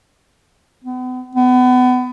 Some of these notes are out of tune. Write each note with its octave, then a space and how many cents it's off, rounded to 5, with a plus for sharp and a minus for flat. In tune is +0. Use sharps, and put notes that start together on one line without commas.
B3 +40
B3 +30